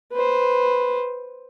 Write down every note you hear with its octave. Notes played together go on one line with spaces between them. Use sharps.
B4 C5